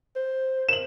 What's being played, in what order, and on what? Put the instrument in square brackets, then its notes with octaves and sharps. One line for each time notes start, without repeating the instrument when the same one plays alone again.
[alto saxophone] C5
[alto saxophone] A#4 [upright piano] E7 F#7